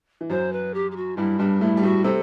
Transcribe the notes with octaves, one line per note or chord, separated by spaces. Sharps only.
E3
F#2 F#3 C5
B4
G4
G4
F#4
G2 G3 E4
G2 G3 D4
A2 A3 E4
G3
A2 A3 F#4
C3 C4 A4